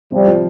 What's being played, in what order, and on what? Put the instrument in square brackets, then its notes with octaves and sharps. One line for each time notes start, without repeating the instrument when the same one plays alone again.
[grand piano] C3 [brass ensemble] F3 G3
[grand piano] F3